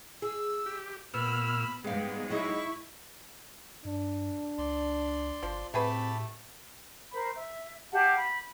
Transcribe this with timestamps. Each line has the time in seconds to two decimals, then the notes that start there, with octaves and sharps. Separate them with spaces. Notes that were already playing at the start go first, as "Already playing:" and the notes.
0.22 G#4 E6
0.66 G4
1.14 A#2 B3 B5 E6 F6
1.84 G#2 G3 G#3 B3 F5 G5
2.30 F#3 D#4 E4 G#4 C#6
3.85 G2 D4
4.58 C#2 D5 C6
5.43 G1 F3
5.74 A2 A3 C4 G4 G#4 B4 A5 B5
7.12 A#4 C5 B5
7.35 E5
7.92 G4 F5 F#5 A5
8.16 B5